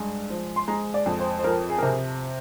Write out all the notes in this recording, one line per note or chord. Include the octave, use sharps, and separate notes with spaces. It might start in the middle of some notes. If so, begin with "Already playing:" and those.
Already playing: G2 G#3
F3
C6
G#3 A#5
D5
F2
C5
C5
F3 A#4
G#4
A#4
C3 G#4